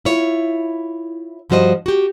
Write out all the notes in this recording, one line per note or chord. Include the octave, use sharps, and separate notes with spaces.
E4 F4 C#5
G2 F3 G3 F#4 C5 D#5
F#4 G4